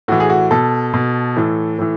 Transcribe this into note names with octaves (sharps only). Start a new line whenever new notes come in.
A2 E3 F#4
G#4
F#4
B2 A4
B2
A2 E3
A2 E3